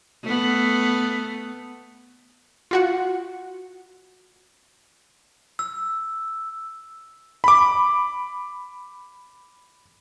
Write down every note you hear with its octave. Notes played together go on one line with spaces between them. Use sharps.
A3 B3
F4 F#4 F#5
E6
B5 D6